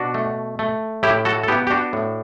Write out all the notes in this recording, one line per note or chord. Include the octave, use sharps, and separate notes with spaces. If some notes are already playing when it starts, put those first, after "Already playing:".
Already playing: B2 D4 F#4
A3
A3
A2 E4 G4
F#4 A4
A4
B3 E4 G4
G4
D4 F#4
A2